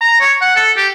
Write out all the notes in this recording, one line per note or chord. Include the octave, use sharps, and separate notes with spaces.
A#5
C#5
F#5
A4
G4